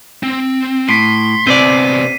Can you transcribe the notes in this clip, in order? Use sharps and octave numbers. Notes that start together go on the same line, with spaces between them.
C4
A2 C6 B6 C7
C3 B3 C4 C5 D5 D#7